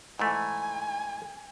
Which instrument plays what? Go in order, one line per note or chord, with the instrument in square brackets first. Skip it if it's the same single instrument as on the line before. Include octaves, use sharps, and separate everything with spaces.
[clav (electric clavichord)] G#2 E3 A3 [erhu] G#5